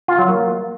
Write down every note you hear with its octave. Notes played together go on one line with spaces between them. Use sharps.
F4
F#3
A#3